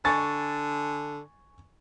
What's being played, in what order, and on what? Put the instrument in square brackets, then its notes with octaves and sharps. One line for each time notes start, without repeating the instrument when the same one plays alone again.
[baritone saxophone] D3 [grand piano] G#5 C#6 A6